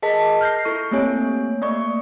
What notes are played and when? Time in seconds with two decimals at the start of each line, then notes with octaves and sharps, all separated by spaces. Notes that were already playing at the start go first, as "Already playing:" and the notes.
0.02 G#4 A#4 D#5 A5 B6
0.41 F6 G6 A#6 C7
0.65 E4 A4 C#6
0.91 A3 A#3 C4 G4 C#5 G#5
1.62 A3 A#3 D5 C#6